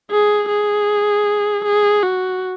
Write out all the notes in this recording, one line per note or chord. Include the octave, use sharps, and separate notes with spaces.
G#4
G#4
G#4
F#4